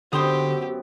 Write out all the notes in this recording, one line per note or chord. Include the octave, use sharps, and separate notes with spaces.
F#2 D3 B3 C4 G4 C5 C6 D#6